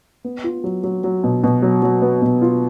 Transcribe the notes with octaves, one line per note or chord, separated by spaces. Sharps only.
B3
F4
F#3
F#3
F#3
B2
B2
F#3
F#3
B3
B2
F4